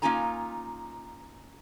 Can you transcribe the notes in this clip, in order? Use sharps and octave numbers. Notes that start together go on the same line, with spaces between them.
A#3 C#4 D#4 F4 G#5 A#5